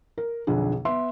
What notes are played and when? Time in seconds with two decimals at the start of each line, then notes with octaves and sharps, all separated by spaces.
0.18 A#4
0.47 B1 F2 D3 G#4
0.85 B3 E5 C6